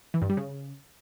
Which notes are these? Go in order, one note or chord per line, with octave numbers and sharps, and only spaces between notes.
E3
G2
G3
C#3